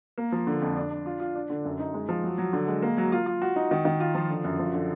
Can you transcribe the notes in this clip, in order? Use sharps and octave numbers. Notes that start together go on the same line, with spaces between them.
A#3
F3
D3
F2
D4
D4
F4
F4
D4
D3
F#2
D#4
G#3
F3
F#3
F#3
D3
G#3
A#3
F#3
F4
F4
F#4
D#4
D#3
D#3
F4
F3
D3
F#2
F3
D3